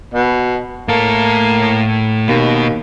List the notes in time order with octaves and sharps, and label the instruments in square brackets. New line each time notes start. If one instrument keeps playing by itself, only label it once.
[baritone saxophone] B2
[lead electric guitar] A2 A4 [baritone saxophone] A#3
[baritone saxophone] D#2 [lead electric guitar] B2